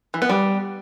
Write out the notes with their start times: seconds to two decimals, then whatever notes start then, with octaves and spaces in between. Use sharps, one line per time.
0.14 E3
0.22 B3
0.29 G3